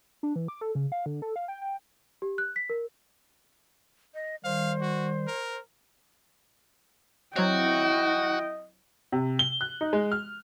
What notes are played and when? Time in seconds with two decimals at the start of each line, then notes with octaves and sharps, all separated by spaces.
0.23 D4
0.36 E3
0.48 D6
0.61 A4
0.75 C#3
0.92 F5
1.06 D3
1.22 A4
1.36 F5
1.48 G5
1.61 G5
2.22 G4
2.38 F#6
2.56 B6
2.70 A#4
4.14 D#5
4.44 D#3 G3 C5 F5
4.81 F#4
5.27 A#4
7.36 F#3 C4 E4 F#4 C#5 D#5 G5
9.12 C3
9.39 G7
9.61 F#6
9.81 D#4
9.93 G#3
10.12 F6